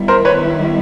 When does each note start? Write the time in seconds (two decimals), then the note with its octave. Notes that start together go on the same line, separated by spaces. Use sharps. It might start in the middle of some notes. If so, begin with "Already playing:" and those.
Already playing: D#3 G3 B3 E4
0.08 A#4 C5
0.25 B4 C#5